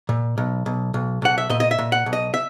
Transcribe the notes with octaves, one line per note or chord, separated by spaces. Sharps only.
A#2
B1
B1
B1
B1 F#5
E5
A#2 D#5
D#5
E5
A#2
F#5
B1
D#5
E5